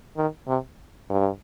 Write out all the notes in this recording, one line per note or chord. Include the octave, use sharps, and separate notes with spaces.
D#3
C3
G2